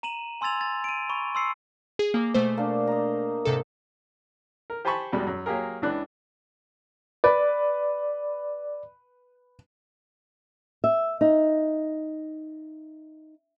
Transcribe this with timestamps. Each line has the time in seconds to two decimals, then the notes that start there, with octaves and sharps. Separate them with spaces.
0.03 A#5 D#7 E7 F#7
0.41 G#5 C6 E6 G#6 A6 F7
0.61 A6
0.84 D7 D#7
1.09 B5 C#6
1.35 C6 E6 C7 C#7
1.99 G#4
2.14 A#3 G#4 D6
2.34 B2 A3 C5
2.57 A#3 D4
2.87 D#5 A#5
3.45 G#2 C3 A4
4.70 A#4
4.85 G4 C5 G#5 A5 B5 C#6
5.13 E2 B2 G3 G#3
5.27 F#2
5.46 F#3 A#3 G4 G#4 A#4
5.82 C#2 E3 D4 F#6
7.24 B4 D5
10.84 E5
11.21 D#4